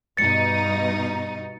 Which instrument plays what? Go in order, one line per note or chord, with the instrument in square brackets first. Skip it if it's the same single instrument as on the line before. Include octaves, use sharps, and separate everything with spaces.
[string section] G2 B2 D#4 [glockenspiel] A6 C#7